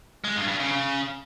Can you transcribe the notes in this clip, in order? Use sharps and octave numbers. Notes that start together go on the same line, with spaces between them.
G#3
G2
G2
C#3
C#3